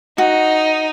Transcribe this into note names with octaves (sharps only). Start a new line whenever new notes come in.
D#4 F#4